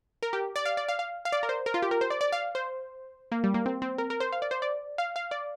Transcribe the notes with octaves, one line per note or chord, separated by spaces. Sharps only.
A#4
G4
D5
F5
D5
F5
F5
F5
D5
A#4
C5
A#4
F4
G4
A#4
C5
D5
D5
F5
C5
A#3
G3
A#3
C4
C4
A#4
A#4
C5
F5
D5
C5
D5
F5
F5
D5